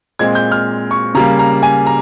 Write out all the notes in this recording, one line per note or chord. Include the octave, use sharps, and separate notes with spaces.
A#2 G#3 C4 G#6
G6
F6
C#6
C#3 G3 A#3 A#5
A#5
G#5
A#5